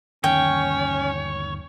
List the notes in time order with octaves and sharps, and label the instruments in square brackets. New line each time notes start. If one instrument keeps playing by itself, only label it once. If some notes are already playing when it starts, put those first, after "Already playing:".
[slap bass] G1 D#2 D#3 [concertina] C#4 [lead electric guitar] C#5 [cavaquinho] G5